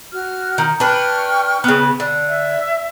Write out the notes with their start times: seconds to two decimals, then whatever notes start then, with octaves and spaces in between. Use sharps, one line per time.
0.13 F#4 F6
0.58 D#3
0.80 D4 B4 G5 C#6 F6
1.64 C#3 B3
2.00 D3
2.29 E5